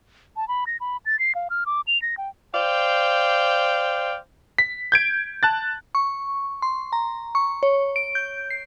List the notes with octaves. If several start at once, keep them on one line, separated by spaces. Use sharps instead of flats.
A5
B5
A#6
B5
A6
C7
F5
F6
D6
F7
A#6
G5
C5 D5 F5 G5
B6
G6 G#6 D7
A5 F#6 A6
C#6
C6
A#5
C#6
C#5
D7
G6
C7